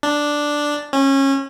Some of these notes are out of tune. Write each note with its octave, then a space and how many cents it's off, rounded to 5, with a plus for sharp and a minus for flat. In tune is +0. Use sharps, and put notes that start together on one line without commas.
D4 +0
C#4 -25